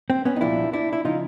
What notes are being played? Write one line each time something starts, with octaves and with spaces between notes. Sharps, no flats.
C4
B3 C#4
D#4
C2 A#2 F3 D4 E4
D4 E4
E4
C#3 F3 D#4 F4